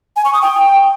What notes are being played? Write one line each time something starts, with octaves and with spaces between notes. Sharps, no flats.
G#5
C#6
D#6
G5